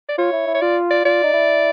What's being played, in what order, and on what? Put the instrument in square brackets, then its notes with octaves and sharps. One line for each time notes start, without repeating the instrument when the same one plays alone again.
[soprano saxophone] D5
[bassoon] F4 [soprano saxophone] C#5
[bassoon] E4
E4
[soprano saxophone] C#5
[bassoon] F4 [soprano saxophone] D5
[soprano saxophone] D5
[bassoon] F4 [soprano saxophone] D5
[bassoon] D#4
E4